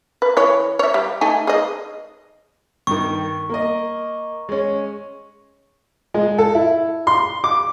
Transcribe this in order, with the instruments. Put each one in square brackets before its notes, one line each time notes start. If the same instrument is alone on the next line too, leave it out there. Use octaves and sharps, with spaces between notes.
[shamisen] B4
E3 C#5
C#5 E5
G3
A3 D#4 G#5
G#4 D#5
[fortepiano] G2 D#3 [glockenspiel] C#6
[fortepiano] A#3 D#5
G#3 C#4
G#3
A4
E4
C6
D6